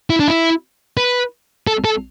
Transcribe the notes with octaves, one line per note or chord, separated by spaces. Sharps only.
E4
D4
E4
B4
A4
A4